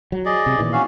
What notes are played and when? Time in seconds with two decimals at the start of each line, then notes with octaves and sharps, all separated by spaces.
0.12 F#3
0.25 G#4 D5 D#5
0.46 C3
0.58 A#2 D#3 E3
0.73 C#4 F#4 F5